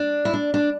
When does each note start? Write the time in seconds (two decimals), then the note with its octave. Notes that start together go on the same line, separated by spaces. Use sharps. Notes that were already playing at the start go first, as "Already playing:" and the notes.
Already playing: D4
0.25 E4
0.34 D4
0.54 D4